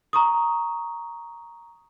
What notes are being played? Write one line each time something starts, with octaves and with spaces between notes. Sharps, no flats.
A#5 C#6 D#6